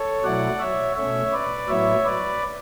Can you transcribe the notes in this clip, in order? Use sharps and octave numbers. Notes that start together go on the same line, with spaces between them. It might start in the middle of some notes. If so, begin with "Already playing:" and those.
Already playing: A4 C#5
B2 F#3 A3 E4 D5 F#5
C#5 E5
B2 A3 C#4 C#5 E5
B4 D5
A2 F#3 B3 E4 C#5 E5
B4 D5